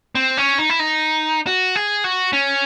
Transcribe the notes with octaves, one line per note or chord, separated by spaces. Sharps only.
C4
C#4
D#4
E4
D#4
F#4
G#4
F#4
C#4